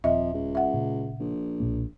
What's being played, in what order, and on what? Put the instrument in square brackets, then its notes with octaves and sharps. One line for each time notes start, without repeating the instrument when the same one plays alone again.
[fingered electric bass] D#1 [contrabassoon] F2 [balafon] D#5 E5
[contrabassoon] C#2
[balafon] E5 F#5
[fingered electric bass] A#2 C#3
[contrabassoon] A#1
[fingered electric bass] B1 A#2 A#3